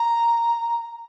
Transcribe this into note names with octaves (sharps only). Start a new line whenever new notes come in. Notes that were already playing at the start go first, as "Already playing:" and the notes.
Already playing: A#5